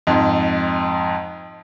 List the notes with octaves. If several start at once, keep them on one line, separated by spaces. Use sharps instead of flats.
F2 G#2